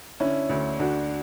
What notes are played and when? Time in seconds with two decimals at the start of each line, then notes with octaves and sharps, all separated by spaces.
0.20 D3 C#4 E4
0.49 D2
0.79 D2 D4 F#4